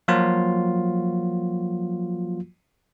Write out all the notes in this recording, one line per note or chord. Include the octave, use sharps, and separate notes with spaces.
F3 F#3 A#3 F4 F#4